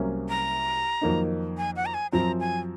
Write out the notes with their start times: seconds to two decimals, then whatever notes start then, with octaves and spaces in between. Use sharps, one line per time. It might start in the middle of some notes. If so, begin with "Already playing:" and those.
Already playing: C2 C3 F#3 A#3 C#4
0.29 A#5
1.01 F2 D#3 F#3 A#3 D#4
1.58 G#5
1.76 F#5
1.86 A#5
1.94 G#5
2.12 F#2 F3 C4 A#5
2.40 G#5